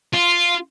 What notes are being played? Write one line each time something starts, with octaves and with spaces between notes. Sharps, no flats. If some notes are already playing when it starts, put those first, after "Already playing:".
F4